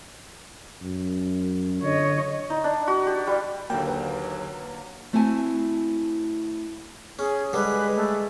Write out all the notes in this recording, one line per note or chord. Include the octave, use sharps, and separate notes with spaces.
F#2
D3 C#5 D#5
D#4
D4
F#4
G4
G3
D#2 D3 F#3 A#3 G5
B4
A3 C4 E4 F#4 G#5 A5
C#4 G#4
D3 G3 G#3 B4
A3